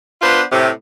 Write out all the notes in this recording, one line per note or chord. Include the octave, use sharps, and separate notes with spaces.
B3 D4 F4 B4 C5
A2 C3